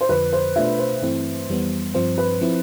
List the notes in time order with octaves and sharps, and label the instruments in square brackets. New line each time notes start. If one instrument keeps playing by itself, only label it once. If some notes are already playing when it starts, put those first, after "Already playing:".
[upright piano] C5
[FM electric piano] F2 D3 F3 [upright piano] B4
[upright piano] C5
[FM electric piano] B2 A3 D4 F4 [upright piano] E5
[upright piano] C5
[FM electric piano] G2 E3 A3 C4 E4
F2 E3 G3 B3
[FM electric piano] G2 F3 C4 [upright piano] C5
[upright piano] B4
[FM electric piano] F3 C4 E4